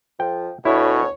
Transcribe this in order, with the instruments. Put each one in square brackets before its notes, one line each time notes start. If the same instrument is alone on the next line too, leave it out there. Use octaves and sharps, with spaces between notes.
[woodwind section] F2 F3 [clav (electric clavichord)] G5
[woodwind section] D2 [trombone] B2 [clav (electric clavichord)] E4 [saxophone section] C#5